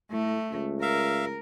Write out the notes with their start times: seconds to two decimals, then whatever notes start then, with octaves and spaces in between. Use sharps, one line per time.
0.12 A2 A3
0.51 C#2
0.82 A#4 E5 F5